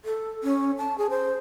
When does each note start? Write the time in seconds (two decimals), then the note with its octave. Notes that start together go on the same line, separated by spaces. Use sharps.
0.05 A4
0.44 C#4
0.78 A5
0.98 G#4
1.10 C5